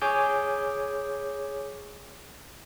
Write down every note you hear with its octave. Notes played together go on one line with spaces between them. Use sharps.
G#4 C#5 G#5 D6 G6